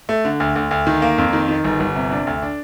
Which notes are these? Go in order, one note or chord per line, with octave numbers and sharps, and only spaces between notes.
A3
D3
D2
D2
D2
D#3
A#3
F2
D#3
D#3
G1
G1
C3
D4
D2
D4